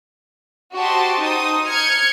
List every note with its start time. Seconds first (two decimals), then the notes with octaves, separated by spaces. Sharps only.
0.76 F#4 G4 C5 D#5 A5 C6
1.21 D#4 C5 D#6
1.68 F6 G6 G#6 C#7